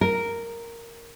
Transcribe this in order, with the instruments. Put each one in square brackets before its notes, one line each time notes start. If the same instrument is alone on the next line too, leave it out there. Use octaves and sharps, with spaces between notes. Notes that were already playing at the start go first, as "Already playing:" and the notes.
[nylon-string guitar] A#4